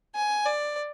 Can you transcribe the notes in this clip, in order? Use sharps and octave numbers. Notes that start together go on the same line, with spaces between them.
G#5
D5